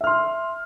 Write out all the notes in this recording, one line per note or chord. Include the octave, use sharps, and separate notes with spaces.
E5 C6 F6